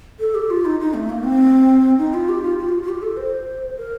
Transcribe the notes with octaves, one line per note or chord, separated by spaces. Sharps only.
A4
G4
F4
D#4
D#4
A3
A#3
C4
D#4
F4
G4
F4
F4
G4
F4
F4
G4
A4
C5
A#4